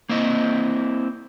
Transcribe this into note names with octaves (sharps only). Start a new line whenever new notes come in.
A#3 C4 E4 D#5